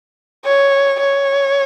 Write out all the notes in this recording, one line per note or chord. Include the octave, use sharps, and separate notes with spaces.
C#5
C#5